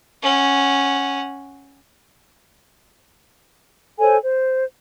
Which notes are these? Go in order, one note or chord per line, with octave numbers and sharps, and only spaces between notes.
C#4 F#5
A4 C5 C#5 G#5
C5